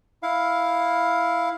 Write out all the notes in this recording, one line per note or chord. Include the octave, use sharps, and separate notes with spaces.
E4 F5